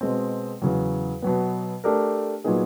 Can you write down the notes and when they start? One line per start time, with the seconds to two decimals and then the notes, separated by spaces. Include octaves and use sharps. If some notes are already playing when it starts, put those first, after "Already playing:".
0.01 B2 G#3 C4
0.62 E2 C#3 F#3
1.22 B2 F#3 B3
1.84 A3 D4 G4 A#4
2.44 A#2 F#3 B3 D#4 G#4